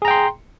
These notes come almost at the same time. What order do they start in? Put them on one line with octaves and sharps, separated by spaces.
G#4 A#5 G5 C6